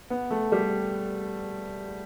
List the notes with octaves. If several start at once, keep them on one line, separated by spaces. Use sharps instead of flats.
B3
A3
G3